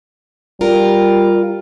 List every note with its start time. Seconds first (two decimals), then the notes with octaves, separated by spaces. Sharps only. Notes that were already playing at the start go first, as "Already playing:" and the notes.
0.61 G3 F4 A#4